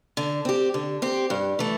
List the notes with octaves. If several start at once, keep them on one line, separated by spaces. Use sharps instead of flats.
D3
C4 G4
D3
C4 G4
G2
E3 A3